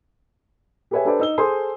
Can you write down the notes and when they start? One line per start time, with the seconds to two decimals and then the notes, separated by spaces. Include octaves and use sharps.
0.91 G4 G#4 B4 C#5 E5 G#5
1.05 D4 G4 A4 B4 C5 D5
1.20 D#4 E6 G7
1.38 G#4 A4 C5 G#5 C6 D#6